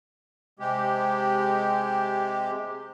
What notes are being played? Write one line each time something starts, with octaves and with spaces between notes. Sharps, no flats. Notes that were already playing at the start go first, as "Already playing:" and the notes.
C3 G#3 G4